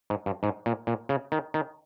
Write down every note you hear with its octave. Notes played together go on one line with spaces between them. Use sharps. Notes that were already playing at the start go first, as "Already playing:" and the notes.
G#2
G2
G#2
A#2
A#2
C#3
D#3
D#3